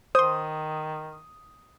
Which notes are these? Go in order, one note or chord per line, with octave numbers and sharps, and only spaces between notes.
D#3 C5 C6 D#6